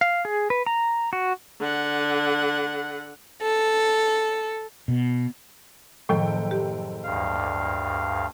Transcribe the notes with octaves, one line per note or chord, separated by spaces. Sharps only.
F5
G#4
B4
A#5
F#4
D3 F#5
A4
B2
F#1 A2 D#3 F3 A4 G5
G4
D2 G2 F5